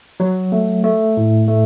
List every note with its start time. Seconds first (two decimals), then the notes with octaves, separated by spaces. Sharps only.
0.20 F#3
0.52 A3
0.84 A3
1.17 A2
1.48 A3